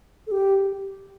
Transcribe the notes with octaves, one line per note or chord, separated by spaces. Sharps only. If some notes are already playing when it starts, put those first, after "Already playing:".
A4
G4